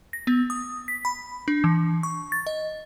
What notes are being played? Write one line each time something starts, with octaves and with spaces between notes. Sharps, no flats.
A#6
B3
D#6
B6
B5
D4
E3
C#6
A6
D#5